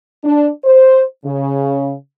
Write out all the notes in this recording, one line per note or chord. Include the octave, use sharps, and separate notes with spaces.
D4
C5
C#3